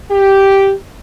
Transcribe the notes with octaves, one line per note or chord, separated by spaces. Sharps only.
G4